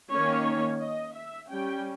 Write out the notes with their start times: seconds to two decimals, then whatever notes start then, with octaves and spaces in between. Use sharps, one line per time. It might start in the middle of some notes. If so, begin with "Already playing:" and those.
0.12 D#3 A#3 C#4 C#5
0.82 D#5
1.16 E5
1.50 G3 C#4 G5